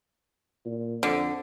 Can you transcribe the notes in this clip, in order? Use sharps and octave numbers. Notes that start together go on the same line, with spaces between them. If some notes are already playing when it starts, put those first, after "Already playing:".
A#2
F2 D3